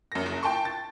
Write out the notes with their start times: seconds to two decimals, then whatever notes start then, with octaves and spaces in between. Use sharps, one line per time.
0.12 F#2 A#6
0.26 F#1
0.43 G5 A5 C6 C#6
0.65 A6